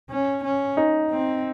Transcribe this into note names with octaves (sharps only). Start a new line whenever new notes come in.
C#4
C#4
D#4
C4